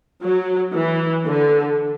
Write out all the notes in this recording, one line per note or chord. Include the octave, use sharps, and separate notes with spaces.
F#3
E3
D3